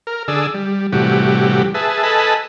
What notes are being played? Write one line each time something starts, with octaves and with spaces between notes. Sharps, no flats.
A#4
D3 G#4 D5 E6
G3
A2 C3 E3 G3 F#4 G4
G#4 B4 E5 A5
A4 B4 D#5 G#5 A5 B5